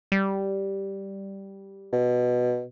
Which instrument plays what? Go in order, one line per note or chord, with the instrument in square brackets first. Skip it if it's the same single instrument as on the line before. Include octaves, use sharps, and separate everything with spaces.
[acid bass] G3
[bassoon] B2